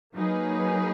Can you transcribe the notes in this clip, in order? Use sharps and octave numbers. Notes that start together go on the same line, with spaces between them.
F#3 A#3 D#4 G#4 B4